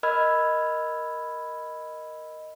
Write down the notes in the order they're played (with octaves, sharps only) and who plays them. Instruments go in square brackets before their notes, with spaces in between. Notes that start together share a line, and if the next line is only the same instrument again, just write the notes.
[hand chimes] A#4 D#5 B5 E6 F6 G#6